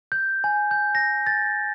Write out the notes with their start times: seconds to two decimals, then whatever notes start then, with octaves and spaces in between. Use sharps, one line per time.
0.12 G6
0.44 G#5
0.71 G6
0.95 A#6
1.26 A6